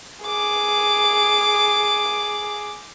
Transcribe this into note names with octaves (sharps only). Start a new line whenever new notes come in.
G#4 D6